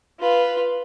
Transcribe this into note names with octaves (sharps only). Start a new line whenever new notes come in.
F4 B4